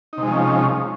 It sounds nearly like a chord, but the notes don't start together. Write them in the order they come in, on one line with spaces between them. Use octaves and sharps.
D#4 C3 G#3 F3 C#4